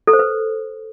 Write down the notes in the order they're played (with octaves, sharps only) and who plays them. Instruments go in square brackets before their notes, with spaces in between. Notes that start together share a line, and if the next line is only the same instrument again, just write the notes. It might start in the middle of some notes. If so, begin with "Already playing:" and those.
[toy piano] A4
C5
B4